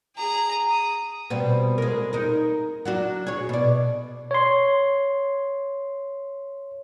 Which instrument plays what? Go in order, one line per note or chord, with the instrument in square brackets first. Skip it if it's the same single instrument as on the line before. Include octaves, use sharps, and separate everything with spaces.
[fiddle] G#4 A#5
D#6
[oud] B2 G3 C4
G#3 A#4
D#4 A#4
F#3 D4 F#4
G#4 C#5
B2 D5
[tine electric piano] C#5 C6